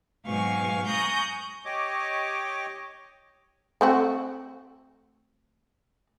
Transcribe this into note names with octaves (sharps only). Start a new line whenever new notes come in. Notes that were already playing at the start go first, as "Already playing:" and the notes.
G#2 B2 F#3 F5 G#5 C#6
G#5 A#5 C#6 D#6 F#6 G6
G4 C#5 D#5 D6
A3 C4 F#4